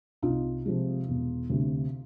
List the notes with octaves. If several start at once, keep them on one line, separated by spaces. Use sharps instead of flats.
C2 D#4 F4
C3 F3 G#3
E1
D2 C3